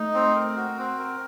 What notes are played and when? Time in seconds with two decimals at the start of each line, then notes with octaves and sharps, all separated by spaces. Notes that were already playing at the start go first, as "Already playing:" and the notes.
Already playing: A3 D#4
0.14 C4
0.35 A#4
0.56 F#4
0.78 C4
0.98 A#4